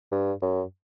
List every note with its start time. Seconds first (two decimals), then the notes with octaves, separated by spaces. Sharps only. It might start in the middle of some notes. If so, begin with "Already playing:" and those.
0.12 G2
0.42 F#2